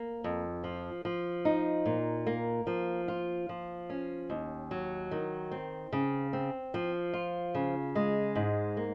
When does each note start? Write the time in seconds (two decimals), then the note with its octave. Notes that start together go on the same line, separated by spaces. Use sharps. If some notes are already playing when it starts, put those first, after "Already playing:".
Already playing: A#3
0.24 F2
0.64 F3
1.05 F3
1.45 D#4
1.86 A#2
2.27 A#3
2.67 F3
3.08 F4
3.49 F3
3.90 C#4
4.30 D#2
4.71 F#3
5.11 D#3
5.51 C4
5.93 C#3
6.33 C4
6.74 F3
7.13 F4
7.54 C#3
7.95 G#3
8.35 G#2
8.77 A#3